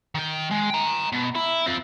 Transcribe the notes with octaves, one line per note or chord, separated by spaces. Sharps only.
D#3 G5
G#3
G5 A#5
B2
E4
C4 F4